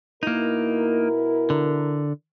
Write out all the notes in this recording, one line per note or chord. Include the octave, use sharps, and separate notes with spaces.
B2 A#3 D#4 E4 A#4
D3